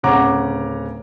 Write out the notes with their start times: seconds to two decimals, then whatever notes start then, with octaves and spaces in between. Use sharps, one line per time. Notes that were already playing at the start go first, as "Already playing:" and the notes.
0.03 D1 C#3 C#5 F#5 A#5 D6